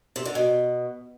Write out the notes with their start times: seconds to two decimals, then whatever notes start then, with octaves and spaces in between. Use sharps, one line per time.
0.16 C3
0.25 D3
0.35 B2